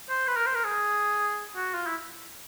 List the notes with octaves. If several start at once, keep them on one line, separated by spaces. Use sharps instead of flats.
C5
B4
A#4
C5
A#4
G#4
F#4
F4
E4